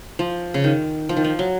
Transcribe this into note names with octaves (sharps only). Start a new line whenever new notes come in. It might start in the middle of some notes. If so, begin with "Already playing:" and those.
F3
C#3
D#3
F3
D#3
F3
F#3